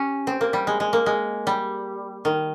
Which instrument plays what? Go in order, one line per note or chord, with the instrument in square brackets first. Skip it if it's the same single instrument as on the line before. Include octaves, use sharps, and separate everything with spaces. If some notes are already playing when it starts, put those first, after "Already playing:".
Already playing: [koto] C#4 G4
C4
A#3
G3
G#3
G#3
A#3
G#3
G3
D#3